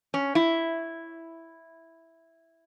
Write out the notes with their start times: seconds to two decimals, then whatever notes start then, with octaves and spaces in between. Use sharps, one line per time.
0.14 C#4
0.35 E4